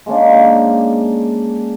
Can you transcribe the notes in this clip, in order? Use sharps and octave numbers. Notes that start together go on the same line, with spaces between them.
G#3 A#3 C#4 D4